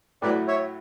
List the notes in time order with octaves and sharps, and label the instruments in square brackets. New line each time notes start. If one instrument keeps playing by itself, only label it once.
[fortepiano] A2 F#3 A3 E4 [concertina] B4 D5
[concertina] C#5 E5